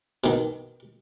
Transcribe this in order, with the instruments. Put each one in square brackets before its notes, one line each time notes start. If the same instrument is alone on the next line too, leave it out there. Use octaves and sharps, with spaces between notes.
[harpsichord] B2 D#3